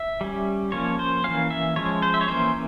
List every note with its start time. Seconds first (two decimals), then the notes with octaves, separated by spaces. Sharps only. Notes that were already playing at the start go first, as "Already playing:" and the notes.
Already playing: E5
0.21 G3 C#4
0.72 F3 A#3 C#4 C#5
0.99 C5
1.24 E3 A#3 C#4 F5
1.50 E5
1.76 F3 G#3 C#4 C#5
2.02 C5
2.14 E5
2.21 C#5
2.28 E3 A#3 C#4 C5